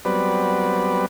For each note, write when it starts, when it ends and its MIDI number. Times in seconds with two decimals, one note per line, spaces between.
0.05 1.06 54
0.05 1.06 55
0.05 1.06 59
0.05 1.06 60
0.05 1.06 71
0.05 1.06 74